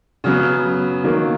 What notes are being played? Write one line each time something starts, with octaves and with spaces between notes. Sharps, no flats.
C#3 F#3 B3
D#3 F#3 A#3